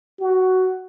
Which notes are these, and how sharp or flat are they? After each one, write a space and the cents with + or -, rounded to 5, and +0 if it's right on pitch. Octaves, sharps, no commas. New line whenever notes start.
F#4 +10